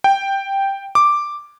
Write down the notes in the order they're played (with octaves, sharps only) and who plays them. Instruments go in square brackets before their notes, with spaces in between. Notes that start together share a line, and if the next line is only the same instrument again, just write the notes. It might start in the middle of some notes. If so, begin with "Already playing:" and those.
[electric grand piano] G5
D6